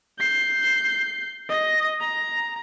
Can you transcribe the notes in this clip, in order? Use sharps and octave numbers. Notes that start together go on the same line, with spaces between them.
G6 C7
D#5 A#6
A#5